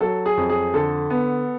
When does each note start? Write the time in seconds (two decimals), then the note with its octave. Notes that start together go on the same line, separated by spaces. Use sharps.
0.01 F#3 A4
0.26 G#4
0.37 F2
0.50 G#4
0.74 D3 A4
1.10 B3